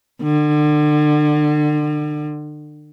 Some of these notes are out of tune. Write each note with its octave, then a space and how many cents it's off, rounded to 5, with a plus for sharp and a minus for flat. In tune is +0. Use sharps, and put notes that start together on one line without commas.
D3 +35